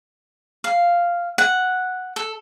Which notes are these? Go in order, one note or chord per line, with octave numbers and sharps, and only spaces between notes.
F5
F#5
A4